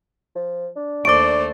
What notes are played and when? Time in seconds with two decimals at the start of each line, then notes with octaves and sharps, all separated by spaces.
0.35 F3
0.76 D4
1.05 D#2 A3 C5 D5 C#6 D6 D7